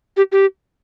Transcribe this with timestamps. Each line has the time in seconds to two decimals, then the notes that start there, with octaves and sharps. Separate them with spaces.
0.17 G4
0.32 G4